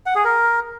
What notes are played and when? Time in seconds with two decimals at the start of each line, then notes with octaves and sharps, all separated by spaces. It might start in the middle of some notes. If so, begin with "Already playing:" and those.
0.06 F#5
0.15 G#4
0.24 A#4